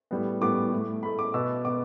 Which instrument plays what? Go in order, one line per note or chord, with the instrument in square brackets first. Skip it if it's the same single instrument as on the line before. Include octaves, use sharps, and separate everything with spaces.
[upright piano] A2 G3 B3
A2 G3 B3 D6
A2 A3
A2 A3 B5
D6
B2 B3 E6
B2 B3 D6